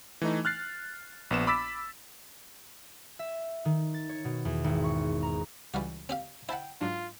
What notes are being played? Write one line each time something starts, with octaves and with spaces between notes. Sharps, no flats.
E3 A3 D#4
F6 F#6 A6 C7
A#1 B3 E7
B5 D6 E6 A6 B6
E5
D#3
A6
C#5
B2
E2
G#1
C#6
A#5
C#2 E3 G3 F#4 F6
C4 G4 F5
E4 C5 F#5 G5 A5 B5
G#2 F#3 D4 F4